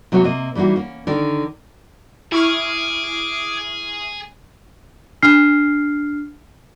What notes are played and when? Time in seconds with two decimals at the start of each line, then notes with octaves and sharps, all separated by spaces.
0.12 C3 F#3 A#3 F#4 C#5
0.24 C3 A#3 D#5
0.55 E3 G3 A#3 D#4 F#4
0.76 A#3 C#4
1.07 D3 D#3 A#4
2.32 E4 G#4 C#6 D6 F6 G#6
5.22 D4 F6 C7